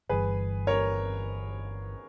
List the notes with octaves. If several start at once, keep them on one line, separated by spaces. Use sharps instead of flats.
G1 G2 E3 G#4 B4
A#4 C#5